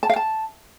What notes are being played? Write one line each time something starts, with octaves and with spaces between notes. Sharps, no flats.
A5
F5
A5